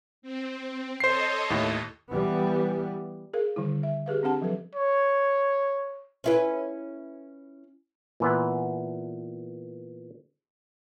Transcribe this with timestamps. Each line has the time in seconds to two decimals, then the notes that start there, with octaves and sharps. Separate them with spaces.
0.22 C4
1.00 A4 C5 C#5 D#5 C7
1.50 D#2 A2
2.11 E3 G3 B3
3.33 G#4 A#4 F5
3.56 D3 D#3 G3 E4
3.83 E5
4.06 G4 G#4 B4 F5
4.23 C4 D4 G4 F#5 A5
4.42 F3 F#3 A4 B4
4.75 C#5
6.24 C#4 E4 B4
8.20 A#2 E3 B3